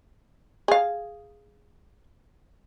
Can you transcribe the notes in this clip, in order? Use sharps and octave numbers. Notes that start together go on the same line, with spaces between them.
G#4 F5